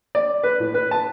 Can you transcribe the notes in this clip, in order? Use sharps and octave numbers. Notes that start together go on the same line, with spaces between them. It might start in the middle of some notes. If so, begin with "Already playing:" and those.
D5
B4
A2
B4
A5